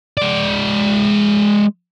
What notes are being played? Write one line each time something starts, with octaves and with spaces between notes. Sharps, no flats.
G#3 D5